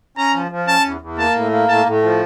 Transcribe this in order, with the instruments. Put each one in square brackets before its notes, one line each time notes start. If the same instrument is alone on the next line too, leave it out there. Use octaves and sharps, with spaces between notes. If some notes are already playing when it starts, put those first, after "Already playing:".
[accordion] C#4 [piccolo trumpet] A#5
[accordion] F3
F3
[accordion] C#4 [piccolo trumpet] A5
[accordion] E2
E2
[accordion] A#3 [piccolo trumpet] A5
[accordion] A2
A#3
[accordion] A2 [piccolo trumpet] A5
[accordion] A2
F3